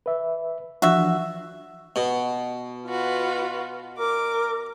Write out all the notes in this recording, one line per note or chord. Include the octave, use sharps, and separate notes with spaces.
B4 E5
E3 F3 D4 F#4 E5
B2
F4 F#4 B4
A#4 D6